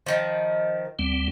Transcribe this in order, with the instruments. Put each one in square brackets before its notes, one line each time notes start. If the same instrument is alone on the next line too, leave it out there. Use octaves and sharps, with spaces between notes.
[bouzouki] D#3 F3
[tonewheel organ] D2 G3 C4